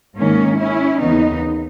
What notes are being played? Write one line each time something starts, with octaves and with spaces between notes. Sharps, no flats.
G#2 D#3 A#3 C#4
C#4 E4
D#2 C#3 E3 B3 D#4